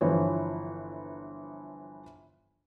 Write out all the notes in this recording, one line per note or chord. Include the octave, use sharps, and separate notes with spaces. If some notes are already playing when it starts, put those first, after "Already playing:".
G1 E3 F3 C#5